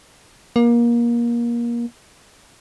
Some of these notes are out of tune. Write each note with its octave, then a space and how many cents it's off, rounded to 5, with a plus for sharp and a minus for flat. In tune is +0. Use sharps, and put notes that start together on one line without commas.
A#3 +25